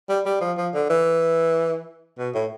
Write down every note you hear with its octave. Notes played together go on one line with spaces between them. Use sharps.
G3
G3
F3
F3
D3
E3
B2
A2